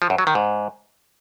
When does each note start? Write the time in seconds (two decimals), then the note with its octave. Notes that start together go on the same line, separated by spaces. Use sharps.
0.02 F3
0.10 F#2
0.18 F#3
0.27 D#3
0.35 G#2